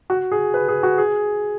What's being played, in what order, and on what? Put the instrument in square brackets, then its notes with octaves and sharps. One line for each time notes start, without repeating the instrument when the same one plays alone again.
[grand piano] F#4
G#4
B4
G#4
F#4
G#4